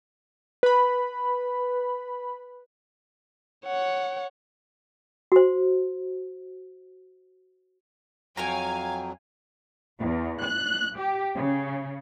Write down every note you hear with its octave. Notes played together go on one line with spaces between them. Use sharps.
B4 B5
C#5 F#5
F#4 C5
F2 F#3 C#5 F5 G5 G#5 A#5
E2
F#6
G4
C#3